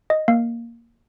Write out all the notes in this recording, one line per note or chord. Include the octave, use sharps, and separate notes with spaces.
D#5
A#3 F5